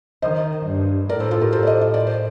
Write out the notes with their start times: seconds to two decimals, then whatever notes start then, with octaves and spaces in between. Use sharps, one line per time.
0.22 D#3 C5 D#5
0.66 G2
1.09 A2 A#4 D5
1.20 A4 C5
1.31 F4 A4
1.41 G4 A#4
1.52 A2 A4 C5
1.63 D5
1.67 C5 D#5
1.81 D#5
1.94 D5
2.07 C5